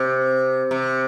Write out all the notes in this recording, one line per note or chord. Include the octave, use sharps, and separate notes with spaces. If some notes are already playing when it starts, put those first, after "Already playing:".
Already playing: C3
C3